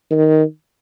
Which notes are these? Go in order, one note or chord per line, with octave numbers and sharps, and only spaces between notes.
D#3